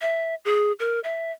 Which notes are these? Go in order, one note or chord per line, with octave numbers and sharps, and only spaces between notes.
E5
G#4
A#4
E5